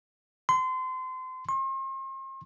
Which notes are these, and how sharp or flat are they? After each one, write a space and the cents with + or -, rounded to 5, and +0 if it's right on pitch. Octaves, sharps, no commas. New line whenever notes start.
C6 -30
C6 +40